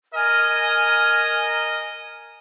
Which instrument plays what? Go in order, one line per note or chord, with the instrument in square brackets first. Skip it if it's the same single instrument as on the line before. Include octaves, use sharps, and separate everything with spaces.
[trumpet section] A#4 D#5 [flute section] G#5 F6